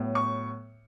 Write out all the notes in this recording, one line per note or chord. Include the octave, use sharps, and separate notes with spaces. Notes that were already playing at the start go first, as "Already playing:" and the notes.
Already playing: A2 F#3 B3
C#6